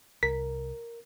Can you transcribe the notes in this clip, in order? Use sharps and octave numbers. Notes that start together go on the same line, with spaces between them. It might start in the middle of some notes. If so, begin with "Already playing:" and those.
C2 A#4 B6